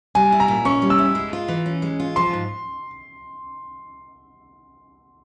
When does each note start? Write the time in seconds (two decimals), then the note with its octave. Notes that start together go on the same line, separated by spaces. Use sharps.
0.15 G3 G#5
0.32 E4
0.40 A#5
0.48 A#2
0.65 C#4 C#6
0.82 G3
0.90 E6
0.98 E4
1.15 G#3
1.33 F4
1.48 E3
1.66 C#4
1.82 G#3
2.00 F4
2.16 F3 C6
2.33 G#2